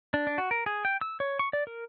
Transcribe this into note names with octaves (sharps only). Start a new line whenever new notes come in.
D4
D4
F#4
A#4
G#4
G5
E6
C#5
C#6
D5
A#4